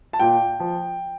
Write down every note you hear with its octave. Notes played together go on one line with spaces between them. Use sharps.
A5
A#2 G5
F3